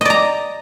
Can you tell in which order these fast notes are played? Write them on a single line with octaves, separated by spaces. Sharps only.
D#5 D5 A#5